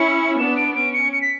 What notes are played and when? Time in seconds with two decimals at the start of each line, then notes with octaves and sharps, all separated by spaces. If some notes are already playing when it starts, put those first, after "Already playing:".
Already playing: C#4 E4 C#7
0.39 B3 D4 E7
0.56 D7
0.75 C#4 D7
0.93 C#7
1.12 C#7
1.21 B6